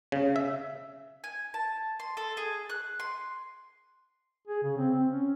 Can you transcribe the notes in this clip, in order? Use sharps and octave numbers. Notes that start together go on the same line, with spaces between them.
C#3
E5
G#5
A5
C6
A4
G#4
F#6
C6
G#4
C#3
C4
C4
C#4